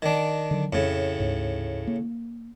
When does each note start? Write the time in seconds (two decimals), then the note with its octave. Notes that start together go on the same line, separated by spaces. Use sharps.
0.02 D#3 D4
0.51 D3 F#3
0.73 F2 A2 C#3
1.20 D2 G#2
1.87 A#3